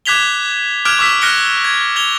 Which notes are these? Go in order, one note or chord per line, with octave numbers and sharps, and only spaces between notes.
D6 F#6 G#6 B6 F7 G7
D6 F6 F#6 G#6 D7 F7
C#6 D6 E6 B6
F6 F#6 A#6 C#7 D7 G7
G#6
G#6 F7 G7